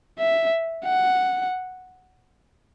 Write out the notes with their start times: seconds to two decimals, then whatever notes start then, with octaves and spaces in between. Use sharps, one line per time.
0.19 E5
0.86 F#5